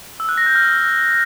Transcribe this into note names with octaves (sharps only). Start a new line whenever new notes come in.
E6
F#6
A#6
G6
F6